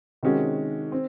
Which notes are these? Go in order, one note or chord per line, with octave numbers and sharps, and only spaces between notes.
C3 D#3 G#3 C#4 F#4
C4